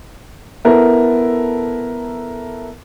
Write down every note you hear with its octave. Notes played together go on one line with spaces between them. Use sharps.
B3 E4 A4 A#4